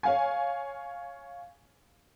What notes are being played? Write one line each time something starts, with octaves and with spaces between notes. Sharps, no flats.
C#5 F5 G#5